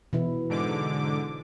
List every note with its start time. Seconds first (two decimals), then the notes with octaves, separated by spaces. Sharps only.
0.13 B2 E3 E4
0.49 G#2 D3 D6